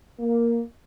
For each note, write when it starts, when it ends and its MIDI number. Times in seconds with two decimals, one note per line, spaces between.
0.20 0.61 58